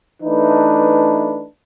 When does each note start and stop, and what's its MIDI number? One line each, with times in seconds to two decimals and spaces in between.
0.22 1.45 52
0.22 1.45 57
0.22 1.45 62
0.22 1.45 63
0.22 1.45 71